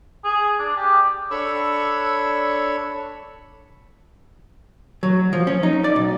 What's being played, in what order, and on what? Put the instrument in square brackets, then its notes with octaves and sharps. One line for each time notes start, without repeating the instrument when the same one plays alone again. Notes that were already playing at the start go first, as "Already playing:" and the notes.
[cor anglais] G#4
D4
G4
[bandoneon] D4 A4 C#5 B5 C#6 E6
[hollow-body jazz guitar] F#3
F3
C#4
D#4
D5
B1